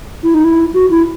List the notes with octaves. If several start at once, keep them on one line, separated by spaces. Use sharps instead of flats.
E4
D#4
E4
F#4
E4